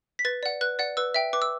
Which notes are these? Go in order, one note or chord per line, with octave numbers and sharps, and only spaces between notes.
B6
B4 A6
D5 F#5
B4 F#6
D5 F#5
B4 E6
E5 G5
B4 D6
E6